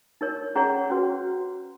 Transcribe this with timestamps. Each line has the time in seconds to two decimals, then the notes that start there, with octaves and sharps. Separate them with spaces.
0.21 D#4 A#4 C#5
0.55 C#4 G#4 C#5 F#5 A#5
0.90 C#4 F#4 B4